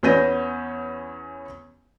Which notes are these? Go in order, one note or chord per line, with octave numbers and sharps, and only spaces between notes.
E2 B3 C#4 G6 A#6 D#7